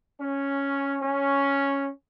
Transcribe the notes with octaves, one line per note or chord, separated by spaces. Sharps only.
C#4
C#4